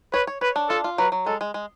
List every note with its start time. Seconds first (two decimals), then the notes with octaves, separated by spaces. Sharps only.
0.14 B4 C#5
0.27 C#5
0.41 B4 C#5
0.56 D4
0.69 F4 A4
0.84 F4
0.98 F#3 B4
1.12 F#3
1.26 G#3 A4
1.41 G#3
1.54 G#3